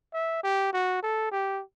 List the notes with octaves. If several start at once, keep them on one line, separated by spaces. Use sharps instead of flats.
E5
G4
F#4
A4
G4